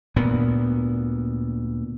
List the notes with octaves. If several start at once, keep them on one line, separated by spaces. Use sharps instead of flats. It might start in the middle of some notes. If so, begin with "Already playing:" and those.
D2 A#2 B3